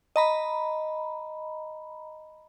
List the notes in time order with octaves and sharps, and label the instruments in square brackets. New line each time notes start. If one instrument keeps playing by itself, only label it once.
[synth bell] D#5 A#5 B5